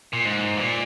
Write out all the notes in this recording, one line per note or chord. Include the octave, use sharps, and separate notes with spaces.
A#2
G#2
A#2